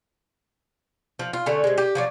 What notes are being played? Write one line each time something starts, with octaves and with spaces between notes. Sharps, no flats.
F3
F4
D3 A3 C#4
C3 G#3
G4
F3 F#3 D4